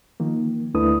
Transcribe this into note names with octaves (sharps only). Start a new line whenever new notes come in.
D#3 F3 A#3
D2 A3 D4 E4 B4 D#6